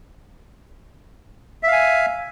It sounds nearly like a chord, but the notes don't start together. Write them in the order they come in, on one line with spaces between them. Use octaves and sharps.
E5 F5 G#5